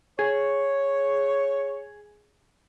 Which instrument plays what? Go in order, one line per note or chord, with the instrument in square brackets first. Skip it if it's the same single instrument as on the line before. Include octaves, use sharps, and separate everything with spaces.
[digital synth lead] G#4 [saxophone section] C#5